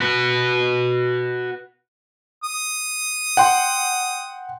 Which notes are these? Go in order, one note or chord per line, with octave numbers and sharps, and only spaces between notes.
F#4 B4
D#6
F#5 G5 C6